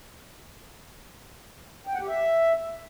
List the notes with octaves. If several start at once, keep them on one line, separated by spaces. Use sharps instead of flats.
G5
F#5
G4
E5